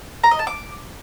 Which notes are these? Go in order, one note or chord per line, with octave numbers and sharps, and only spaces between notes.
A#5
D#5
A5
D6